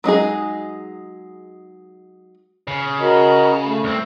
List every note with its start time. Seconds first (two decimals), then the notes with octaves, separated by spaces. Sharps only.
0.04 F#3 G#3 D#4 G#4
2.68 C#3
3.00 F#4 A#4 D#5
3.65 A3
3.84 C2 C4